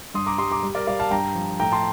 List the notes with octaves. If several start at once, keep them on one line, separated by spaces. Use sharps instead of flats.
G2 C6 D#6
A#5 D6
G3 C6 D#6
A#5 D6
G3
A#4 D5
G3 D5 F5
F5 A5
G2 G5 A#5
F3
A2 G5 A#5
A5 C6